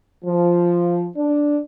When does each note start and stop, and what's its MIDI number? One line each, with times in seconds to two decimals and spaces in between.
0.25 1.07 53
1.16 1.58 62